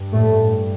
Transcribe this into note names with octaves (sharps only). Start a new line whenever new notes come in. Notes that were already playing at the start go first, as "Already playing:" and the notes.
Already playing: G2
A2 A3